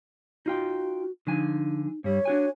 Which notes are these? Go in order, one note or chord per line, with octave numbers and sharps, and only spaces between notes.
D#4 F4 F#4 G5
D3 F3 D#4 G#5
G2 G3 C#5
D4 F#4 G#5